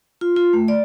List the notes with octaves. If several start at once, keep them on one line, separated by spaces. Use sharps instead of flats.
F4
F4
A3
D5